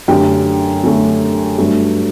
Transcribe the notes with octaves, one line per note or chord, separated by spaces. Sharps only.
F#2 D3 A3 G4 G5
F#2 D3 A3
G2 F#3 A3